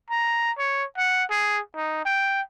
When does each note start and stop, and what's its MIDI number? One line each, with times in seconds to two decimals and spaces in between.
0.10 0.52 82
0.58 0.84 73
0.97 1.24 78
1.30 1.60 68
1.75 2.04 63
2.05 2.41 79